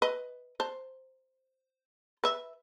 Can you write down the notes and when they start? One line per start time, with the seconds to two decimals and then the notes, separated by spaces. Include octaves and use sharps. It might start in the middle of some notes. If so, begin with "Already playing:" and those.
0.02 B4 D#5
0.60 C5 A5
2.24 B4 E5